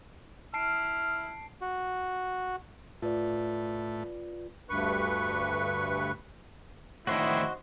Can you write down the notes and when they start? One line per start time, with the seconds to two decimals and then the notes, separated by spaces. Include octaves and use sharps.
0.54 E4 A5 F6 C7 D7
1.61 F#4
3.02 A2 A3 F4 B4 D5
4.70 D2 G2 B4 C#6
7.07 A2 D3 D#3 E4 F#4 C5 D#5